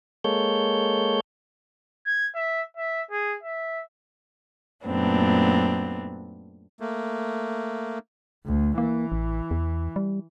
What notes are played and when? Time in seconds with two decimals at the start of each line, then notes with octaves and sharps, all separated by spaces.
0.24 G#3 A#3 A4 C#5 G6
2.06 G#6
2.35 E5
2.77 E5
3.11 G#4
3.43 E5
4.86 F#2 A#2 A3 B3 C4 D4
6.80 A3 A#3
8.45 D2
8.78 E3 A#3
9.12 A1
9.51 E2
9.96 G3